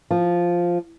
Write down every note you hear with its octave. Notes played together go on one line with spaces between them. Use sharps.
F3